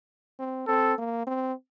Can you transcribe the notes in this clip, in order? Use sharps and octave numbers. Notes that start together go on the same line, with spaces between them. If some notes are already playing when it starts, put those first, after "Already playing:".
C4
C4 A4
A#3
C4